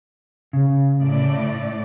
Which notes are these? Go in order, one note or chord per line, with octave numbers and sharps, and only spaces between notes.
C#3
A2 D5